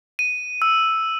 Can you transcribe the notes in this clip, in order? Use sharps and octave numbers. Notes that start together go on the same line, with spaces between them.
D#7
E6